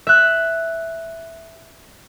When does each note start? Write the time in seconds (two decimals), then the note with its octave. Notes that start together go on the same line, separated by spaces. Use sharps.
0.07 E5 F#6